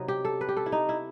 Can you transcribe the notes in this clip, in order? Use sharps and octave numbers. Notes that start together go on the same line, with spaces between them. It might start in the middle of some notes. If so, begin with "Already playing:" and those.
Already playing: C3 F#3 B3 D#4 D#5
G4
A4
B4
G4
A4
E4
D#4
E4